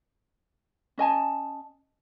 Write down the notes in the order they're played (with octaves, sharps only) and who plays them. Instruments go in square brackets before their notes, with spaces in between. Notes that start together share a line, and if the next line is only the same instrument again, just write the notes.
[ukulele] C#4 D#5 G#5 A5